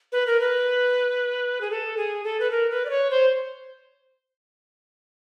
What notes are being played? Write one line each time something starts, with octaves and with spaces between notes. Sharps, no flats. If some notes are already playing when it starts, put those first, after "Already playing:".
B4
A#4
B4
G#4
A4
G#4
A4
B4
A#4
B4
D5
C#5
C5